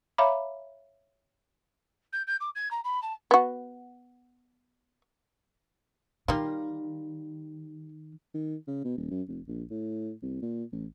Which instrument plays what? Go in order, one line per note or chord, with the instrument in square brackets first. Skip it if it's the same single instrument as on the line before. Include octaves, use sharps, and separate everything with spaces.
[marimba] C#5 E5 F5 A#5 B5 D6
[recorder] G6
G6
D6
G#6
A#5
B5
A5
[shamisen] B3 F#4
[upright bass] D#3 [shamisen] G3 A#3 F4
[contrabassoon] D#3
C#3
B2
D#1
F#2
F1
A#1
A2
C2
A#2
A1